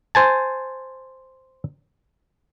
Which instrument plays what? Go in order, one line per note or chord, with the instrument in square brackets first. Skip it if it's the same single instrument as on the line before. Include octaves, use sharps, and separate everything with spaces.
[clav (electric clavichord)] C5 G#5 A5